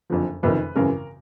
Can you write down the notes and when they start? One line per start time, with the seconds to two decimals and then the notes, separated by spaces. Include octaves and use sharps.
0.10 F#1 F2 D3 F3
0.43 F#1 F2 C3 D#3 B4
0.76 G#1 F#2 C#3 E3 A#4